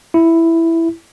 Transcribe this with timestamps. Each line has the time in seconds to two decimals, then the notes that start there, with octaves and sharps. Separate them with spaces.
0.14 E4